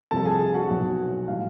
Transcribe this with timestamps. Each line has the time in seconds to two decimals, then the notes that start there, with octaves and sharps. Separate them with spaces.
0.11 C2 C3 F3 A4 A5
0.25 G#4 G#5
0.40 G#4 G#5
0.54 F#4 F#5
0.69 B1 B2 F#3
1.28 A2 E3 G3 F5